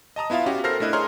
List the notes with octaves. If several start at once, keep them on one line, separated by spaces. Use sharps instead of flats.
D#5 A5 A#5 D#6
B3 E4 F4 E5 F5
C#4 F#4 G4
A4 A#4 C5 F6 A#6 C7
A3 D4 E4 D#5 F#6
G#4 A#4 C#5 A#5 C6 F6